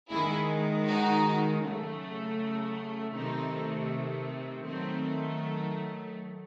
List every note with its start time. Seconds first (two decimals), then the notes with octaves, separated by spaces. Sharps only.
0.11 D#3 G#3 E4 G#4
0.87 D#4 F#4
1.63 C#3 F#3 A3
3.14 C3 D#3 A3 C4 D#4
4.65 D#3 F#3 A3 C4